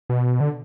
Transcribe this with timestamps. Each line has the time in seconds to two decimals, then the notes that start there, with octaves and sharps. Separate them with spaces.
0.10 B2
0.40 D3